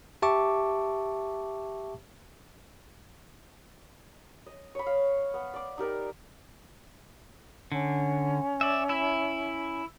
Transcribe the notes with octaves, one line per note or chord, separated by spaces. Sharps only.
G4 E5 A5 C#6 D6
D#5
C#5 B5
F5
B3
D5 D6
D#4 G4 A#4 D5
D3 C#4
D5 E5
E4 E5